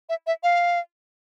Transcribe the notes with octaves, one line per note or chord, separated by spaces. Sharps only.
E5
E5
F5